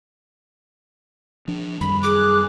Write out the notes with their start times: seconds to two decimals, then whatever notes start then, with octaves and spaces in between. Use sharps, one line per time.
1.48 F3 D4
1.81 F#2 D#3 G3 B5
2.03 G#4 D6 F#6